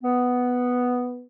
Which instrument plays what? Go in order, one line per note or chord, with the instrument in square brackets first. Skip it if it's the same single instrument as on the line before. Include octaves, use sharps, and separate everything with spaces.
[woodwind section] B3